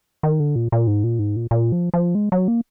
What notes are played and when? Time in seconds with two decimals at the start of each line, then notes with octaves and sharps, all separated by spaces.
0.23 D#3
0.40 D3
0.56 A#2
0.72 A#2
0.87 G#2
1.04 A#2
1.19 G#2
1.36 A#2
1.51 A#2
1.72 F3
1.94 F3
2.15 G#3
2.32 F#3
2.48 A#3